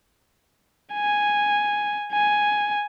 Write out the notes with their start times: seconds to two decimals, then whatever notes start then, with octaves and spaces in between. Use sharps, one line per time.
0.94 G#5
2.13 G#5